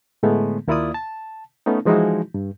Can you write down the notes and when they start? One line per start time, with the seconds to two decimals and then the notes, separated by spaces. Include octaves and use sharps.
0.23 A2 D3 G#3 A3 B3
0.68 D#2 A#3 E4 F4 D5 D#6
0.94 A5
1.66 A3 B3 C#4 D#4
1.85 E3 F3 G#3 D#4 E4 F#4
2.34 G2